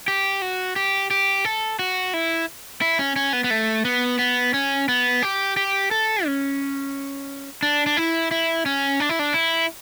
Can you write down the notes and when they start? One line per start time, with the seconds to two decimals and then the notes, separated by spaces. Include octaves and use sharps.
0.08 G4
0.42 F#4
0.76 G4
1.11 G4
1.45 A4
1.79 F#4
2.14 E4
2.81 E4
2.99 C#4
3.16 C#4
3.33 B3
3.44 B3
3.50 A3
3.85 B3
4.19 B3
4.54 C#4
4.89 B3
5.22 G4
5.57 G4
5.91 A4
6.25 C#4
7.62 D4
7.86 D4
7.97 E4
8.31 E4
8.66 C#4
9.00 D4
9.09 E4
9.19 D4
9.34 E4